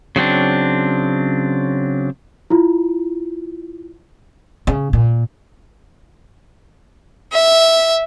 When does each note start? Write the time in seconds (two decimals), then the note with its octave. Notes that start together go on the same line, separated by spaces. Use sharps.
0.16 C#3 F#3 C4 D4
2.50 E4 F4
4.67 C#3
4.93 A#2
7.33 E5